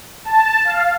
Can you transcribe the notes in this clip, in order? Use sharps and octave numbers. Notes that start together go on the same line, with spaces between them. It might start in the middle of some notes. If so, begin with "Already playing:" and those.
A5
F5